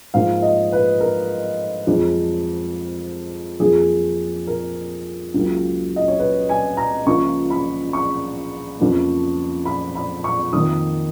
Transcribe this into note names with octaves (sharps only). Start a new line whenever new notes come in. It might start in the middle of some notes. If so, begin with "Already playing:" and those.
G#2 F3 A#3 F5
D#5
B4
A#4
F2 F3 G#3
F2 F3 A#3 G#4
A#4
C#2 C#3 F#3 A#3
D#5
C#5
B4
G#5
A#5
C#2 C#3 F3 A#3 C#6
B5
C#6
F2 C#3 F3 A#3
B5
B5
C#6
F2 D#3 A#3 D#6